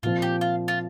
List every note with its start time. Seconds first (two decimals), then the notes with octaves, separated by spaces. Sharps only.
0.03 A#2 F3 C4 F4
0.22 G4
0.41 F4
0.68 F4